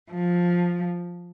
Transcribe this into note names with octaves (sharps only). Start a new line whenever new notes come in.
F3